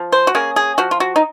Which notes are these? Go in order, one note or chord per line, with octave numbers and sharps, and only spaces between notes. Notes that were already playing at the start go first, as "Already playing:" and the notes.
Already playing: F3
C5
F#4
A#3 C#4 G#4
G#4
F3 F#4
F4
F#4
D#4